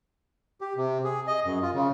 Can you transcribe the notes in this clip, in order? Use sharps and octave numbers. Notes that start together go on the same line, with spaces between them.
G4
C3
G#4
D#5
F#2
F4
C#3